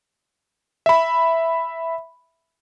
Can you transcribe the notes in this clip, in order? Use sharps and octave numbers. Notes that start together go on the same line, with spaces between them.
E5 B5